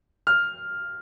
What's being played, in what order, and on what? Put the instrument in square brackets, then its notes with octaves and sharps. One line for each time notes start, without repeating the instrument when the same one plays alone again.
[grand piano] F6